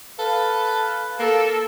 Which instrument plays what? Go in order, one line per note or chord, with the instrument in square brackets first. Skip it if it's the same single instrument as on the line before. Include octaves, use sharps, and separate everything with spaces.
[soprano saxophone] A4 [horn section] B4 F5
[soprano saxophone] A#3 [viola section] A4